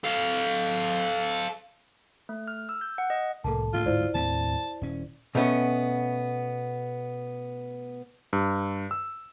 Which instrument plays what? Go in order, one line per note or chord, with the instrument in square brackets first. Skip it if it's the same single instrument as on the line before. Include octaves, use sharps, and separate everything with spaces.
[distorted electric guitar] A4 F5
[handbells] A3
F6
E6
G6
F#5
D#5
[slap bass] C2 A2 [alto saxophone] A#3 [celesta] A4 A5
[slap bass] D2 A2 A#3 [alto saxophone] F4
[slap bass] D1 G#2 [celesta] E4 C5 D5
[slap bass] D#2 A2 C4 [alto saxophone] A5
[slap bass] D#1 C#4
[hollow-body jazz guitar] B2 A3 B3 C#4
[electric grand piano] G2
E6